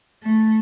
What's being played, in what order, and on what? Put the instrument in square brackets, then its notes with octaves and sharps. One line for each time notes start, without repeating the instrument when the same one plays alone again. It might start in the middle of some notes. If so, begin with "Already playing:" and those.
[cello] A3